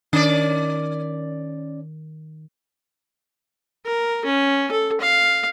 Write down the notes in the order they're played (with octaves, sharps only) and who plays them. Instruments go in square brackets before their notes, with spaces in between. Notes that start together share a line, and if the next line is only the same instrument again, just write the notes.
[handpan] D#3 [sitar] C#4 D5
[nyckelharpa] A#4
C#4
A4
F5